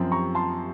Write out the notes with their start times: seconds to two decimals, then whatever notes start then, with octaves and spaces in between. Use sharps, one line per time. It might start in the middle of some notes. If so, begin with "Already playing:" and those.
Already playing: F#2 F3 C4
0.12 A#5 C#6
0.35 A5 C6